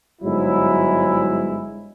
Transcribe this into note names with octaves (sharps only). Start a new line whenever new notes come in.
G1 G#2 F#3 G#3 E4